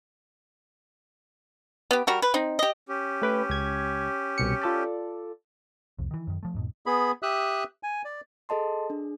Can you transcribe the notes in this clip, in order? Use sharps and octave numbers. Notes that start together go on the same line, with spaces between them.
B3 G4
G3 F#4 A#4
B4
C4 D#4
G4 D#5
C#4 G4
A3 B4 G5
C#2 G#6
C2 B2 C#7
F4 A4 D5
C2 F2
D#3 E3
F#2 D#3
F3 A3
E2 G#2 B2
B3 G#4 B5
G4 E5 D#6 E6 F#6
G#5
D5
G#4 A4 D#5 A5 C6
D4 G#4